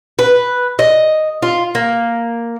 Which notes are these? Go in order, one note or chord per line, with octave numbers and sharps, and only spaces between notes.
B4
D#5
F4
A#3